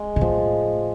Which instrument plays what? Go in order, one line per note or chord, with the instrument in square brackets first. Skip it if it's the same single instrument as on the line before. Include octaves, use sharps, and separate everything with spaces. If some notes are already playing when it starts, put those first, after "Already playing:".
Already playing: [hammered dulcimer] G#3
[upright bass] B2
[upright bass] A2 [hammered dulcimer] F3